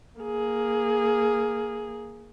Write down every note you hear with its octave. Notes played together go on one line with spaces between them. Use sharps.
A#3 G#4